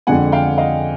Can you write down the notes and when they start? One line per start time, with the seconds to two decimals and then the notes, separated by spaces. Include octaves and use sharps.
0.07 F2 D3 F3 G#3 F#5 G#5
0.32 F5 G5
0.58 D#5 F5